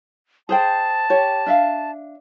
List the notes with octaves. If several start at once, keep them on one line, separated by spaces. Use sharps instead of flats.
G#4 C5 G5 A5
G4 C#5
D4 E5 F5